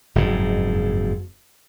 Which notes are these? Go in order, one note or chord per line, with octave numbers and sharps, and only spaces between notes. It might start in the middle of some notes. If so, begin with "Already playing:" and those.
F#1 F2 G#2